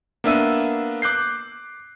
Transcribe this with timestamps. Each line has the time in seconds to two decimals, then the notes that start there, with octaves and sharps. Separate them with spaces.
0.24 A#3 B3 D4 E5 E6 D#7
1.02 D6 F#6 G6 C7